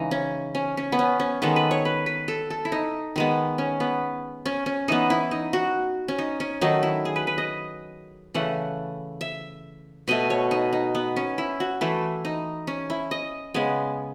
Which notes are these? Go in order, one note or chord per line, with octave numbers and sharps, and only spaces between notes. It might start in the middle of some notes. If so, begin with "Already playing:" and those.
Already playing: C#3 E3 G#3 D#4
C#4
C#4
C#4
B3
C#4
C#4
D#3 G#3 B3 A4
B4
C#5
B4
B4
A4
A4
E4
D#4
D#3 G#3 B3
C#4
B3
C#4
C#4
E3 B3 D#4
E4
D#4
F#4
C#4
D#4
C#4
D#3 F#3 A3 D#4
E4
G#4
B4
B4
D#5
C#3 E3 A3 F#5
E5
B2 A3 D#5
C#5
D#4
D#4
B3
C#4
E4
F#4
E3 A3 E4
D#4
C#4
E4
D#5
C#3 G#3 B3